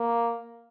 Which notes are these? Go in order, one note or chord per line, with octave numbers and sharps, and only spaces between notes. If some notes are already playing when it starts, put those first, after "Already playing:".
Already playing: A#3